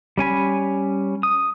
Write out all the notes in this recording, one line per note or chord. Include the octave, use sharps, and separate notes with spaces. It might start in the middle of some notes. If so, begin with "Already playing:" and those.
G3 C#4 G#5 B5
D#6